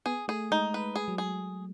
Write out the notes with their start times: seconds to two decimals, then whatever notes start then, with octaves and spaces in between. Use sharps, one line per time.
0.06 B3 G#4
0.28 A3 G#4
0.51 G#3 D#4
0.74 B4
0.96 G#4
1.08 F#3
1.18 G#4